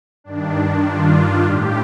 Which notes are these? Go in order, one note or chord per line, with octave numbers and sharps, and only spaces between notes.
G2 D#3 D4
F4
A2 G4